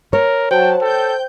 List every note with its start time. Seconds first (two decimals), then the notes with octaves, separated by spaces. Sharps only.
0.13 A#4 C#5
0.51 F#3 C5 G5 A5
0.82 A4 G5 G6